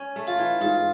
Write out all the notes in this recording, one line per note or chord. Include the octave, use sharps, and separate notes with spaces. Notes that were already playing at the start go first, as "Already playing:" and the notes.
Already playing: C#4
A3
F4
E3
G#2 F4